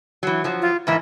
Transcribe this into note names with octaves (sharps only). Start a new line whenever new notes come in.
E3 F#3
F3 F#3
F4
G#2 E3 A#3 E5